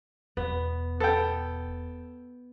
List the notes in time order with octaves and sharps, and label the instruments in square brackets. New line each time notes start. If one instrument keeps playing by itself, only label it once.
[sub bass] E1 [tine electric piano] E2 [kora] B3
[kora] B3 [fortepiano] A4 G5